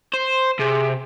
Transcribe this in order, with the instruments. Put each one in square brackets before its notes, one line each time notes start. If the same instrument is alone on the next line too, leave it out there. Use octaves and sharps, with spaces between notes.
[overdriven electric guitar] C5
[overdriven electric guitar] C3 [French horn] G#4